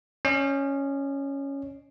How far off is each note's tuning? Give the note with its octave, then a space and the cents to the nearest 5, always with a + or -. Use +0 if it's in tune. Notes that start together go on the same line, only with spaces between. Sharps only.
C#4 +0 D#5 -45